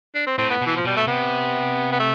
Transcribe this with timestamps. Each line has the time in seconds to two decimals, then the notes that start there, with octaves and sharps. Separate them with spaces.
0.15 D4
0.26 C4
0.38 A2 C4
0.50 B3
0.62 B2 E3
0.77 F3
0.85 B2 G3
0.97 A3
1.07 C3 B3
1.92 B3
2.00 A3